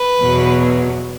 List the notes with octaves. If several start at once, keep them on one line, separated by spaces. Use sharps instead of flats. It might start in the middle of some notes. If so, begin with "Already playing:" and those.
Already playing: B4
E2 B2 F#3